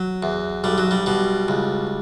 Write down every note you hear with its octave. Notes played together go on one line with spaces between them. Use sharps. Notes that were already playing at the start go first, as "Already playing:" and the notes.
Already playing: F#3
E2
B1 G3
F#3
G3
B2 G3
C#2